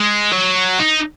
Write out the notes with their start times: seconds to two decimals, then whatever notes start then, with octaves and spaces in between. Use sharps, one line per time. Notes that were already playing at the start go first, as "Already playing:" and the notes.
Already playing: G#3
0.33 F#3
0.79 D#4